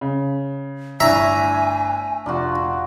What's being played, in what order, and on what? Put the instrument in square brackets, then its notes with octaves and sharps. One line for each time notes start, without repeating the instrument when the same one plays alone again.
[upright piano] C#3
[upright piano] G1 D4 E4 [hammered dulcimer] A3 [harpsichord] E5 A#5 [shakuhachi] G#5
[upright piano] F1 [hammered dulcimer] D4 F4 F#4